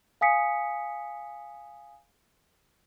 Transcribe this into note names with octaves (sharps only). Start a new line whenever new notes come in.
F5 G#5 D#6 B6 C#7